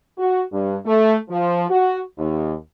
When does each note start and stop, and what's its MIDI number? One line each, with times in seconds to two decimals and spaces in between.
0.18 0.42 66
0.53 0.78 43
0.86 1.16 57
1.30 1.65 53
1.70 1.99 66
2.18 2.54 39